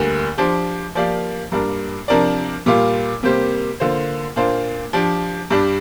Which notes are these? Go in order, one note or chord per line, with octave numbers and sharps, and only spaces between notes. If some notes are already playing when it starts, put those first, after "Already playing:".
Already playing: D2 D3 G3 A#3
F3 D4 G4 C5
F3 A#3 G4 D5 F5
G2 G3 A#3 D4 A#4
C3 F3 D4 A#4 D5
A#2 G3 A#3 F4
C3 G3 A#3 G4 C5
D3 A#3 F4 C5
A#2 A#3 D4 F4 C5
F3 D4 G4
G2 G3 D4 G4